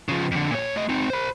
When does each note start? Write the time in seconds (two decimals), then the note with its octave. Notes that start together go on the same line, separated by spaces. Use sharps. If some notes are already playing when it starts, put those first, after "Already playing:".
0.09 C#3 F3
0.31 F2 D3
0.50 A#2 C#5
0.76 A3 D#5
0.89 C4 D#4
1.10 C5 B5